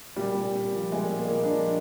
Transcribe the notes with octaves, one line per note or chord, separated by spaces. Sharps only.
A#2 G3
A#2
A#2
F3
A#2 G#3
A#2
A#3
A#2
D4
F3